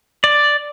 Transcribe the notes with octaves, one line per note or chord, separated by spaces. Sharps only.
D5